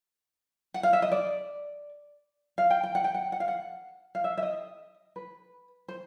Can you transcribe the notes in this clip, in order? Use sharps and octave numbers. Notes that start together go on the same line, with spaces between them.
F#5
F5
E5
D#5
D5
F5
G5
G5
F#5
G5
F#5
F#5
F5
F#5
F5
E5
E5
D#5
B4
C5